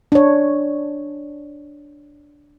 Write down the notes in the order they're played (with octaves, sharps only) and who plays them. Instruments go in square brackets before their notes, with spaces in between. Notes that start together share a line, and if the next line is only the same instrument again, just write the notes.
[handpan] D4 C#5